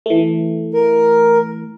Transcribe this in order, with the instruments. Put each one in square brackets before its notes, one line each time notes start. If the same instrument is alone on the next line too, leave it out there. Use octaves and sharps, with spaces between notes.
[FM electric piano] E3 A3
[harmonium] A#4